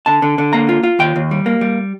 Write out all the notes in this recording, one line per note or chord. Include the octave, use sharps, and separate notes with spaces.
D3 A5
D3
D3
A#3 A#5
F4
F4
D#2 G5
D#2
G3
A#3
G3